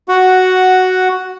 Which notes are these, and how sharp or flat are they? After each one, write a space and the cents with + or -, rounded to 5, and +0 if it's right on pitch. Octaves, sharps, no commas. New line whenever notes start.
F#4 +5 F#5 +0